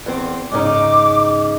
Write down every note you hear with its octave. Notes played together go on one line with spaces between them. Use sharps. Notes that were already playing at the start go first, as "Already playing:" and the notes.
E2 C4
G#2 C#3 D#4 D6